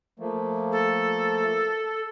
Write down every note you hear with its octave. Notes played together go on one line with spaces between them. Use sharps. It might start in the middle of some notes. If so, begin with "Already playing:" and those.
F3 A3 A#3
A4